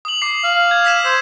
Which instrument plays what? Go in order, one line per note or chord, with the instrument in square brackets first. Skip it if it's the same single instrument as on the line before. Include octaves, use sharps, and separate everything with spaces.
[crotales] D#6 F#7
D6 C7
[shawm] F5
[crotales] G#6
E6 B6 E7
[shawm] C5 [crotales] E6